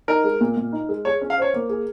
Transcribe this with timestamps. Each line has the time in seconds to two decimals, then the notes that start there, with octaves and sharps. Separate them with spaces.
0.08 D#4 A#4
0.24 G#3
0.41 A#2
0.57 A#2
0.73 D#4
0.89 G#3
1.05 G#4 C#5
1.21 C#4
1.30 F5
1.38 C5 C#5
1.54 A#3
1.69 G#4